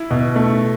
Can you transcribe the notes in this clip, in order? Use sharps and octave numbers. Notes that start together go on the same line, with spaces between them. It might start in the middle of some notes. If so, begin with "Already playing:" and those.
Already playing: E4
B2
A3